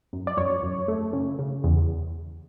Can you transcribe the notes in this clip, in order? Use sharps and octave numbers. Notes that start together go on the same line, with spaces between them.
F#2
D5
F#2 C#5
F#2
A3
C#3
C#3
E2